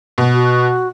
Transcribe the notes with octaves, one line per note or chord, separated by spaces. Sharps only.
B2
F#4